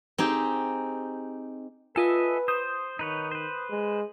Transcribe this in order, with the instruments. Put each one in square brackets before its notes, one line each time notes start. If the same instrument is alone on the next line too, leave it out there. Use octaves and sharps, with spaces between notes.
[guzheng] C4 D#4 G4 G#4
[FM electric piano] F4 G#5 [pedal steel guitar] A4 D#5 E5 [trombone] B4
[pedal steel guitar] C5 [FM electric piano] D#6 G6
[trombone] D#3 [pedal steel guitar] D#4 B4 C#5
[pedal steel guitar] B4 C5
[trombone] G#3